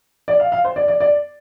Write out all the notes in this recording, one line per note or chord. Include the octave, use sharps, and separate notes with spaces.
D5
F5
F5
C5
D5
D5
D5